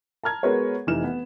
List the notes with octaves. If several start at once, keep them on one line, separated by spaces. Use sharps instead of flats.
A5 A#5 F6 G#6
G#3 B3 F#4 A#4 B4 C#5
F1 E3 D#4 F6 E7
B3